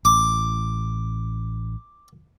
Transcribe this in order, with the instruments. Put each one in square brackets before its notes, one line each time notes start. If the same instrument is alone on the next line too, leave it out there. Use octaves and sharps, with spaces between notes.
[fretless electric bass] A1 [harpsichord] D6